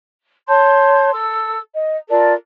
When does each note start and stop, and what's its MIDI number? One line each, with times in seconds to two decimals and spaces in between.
0.48 1.10 73
0.48 1.10 81
0.48 1.10 84
0.48 1.10 91
1.13 1.59 69
1.13 1.59 88
1.74 1.95 75
2.09 2.33 65
2.09 2.33 69
2.09 2.33 70
2.09 2.33 74